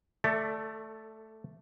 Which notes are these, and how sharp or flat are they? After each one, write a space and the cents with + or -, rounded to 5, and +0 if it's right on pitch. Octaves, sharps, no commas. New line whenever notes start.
A3 +0 A4 +25 D5 +0